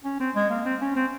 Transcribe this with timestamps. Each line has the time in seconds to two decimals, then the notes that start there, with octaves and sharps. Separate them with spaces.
0.05 C#4
0.20 C4
0.35 G#3
0.50 A#3
0.65 C4
0.81 C#4
0.96 C4